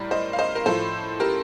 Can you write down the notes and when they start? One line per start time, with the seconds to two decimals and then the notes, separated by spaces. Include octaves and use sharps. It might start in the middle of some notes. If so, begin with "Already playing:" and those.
Already playing: A2 G3 A#4 D5
0.11 C5 D#5
0.33 F5
0.38 C5 D#5
0.55 A#4
0.66 A2 F3 A4 C5
1.20 G4 A#4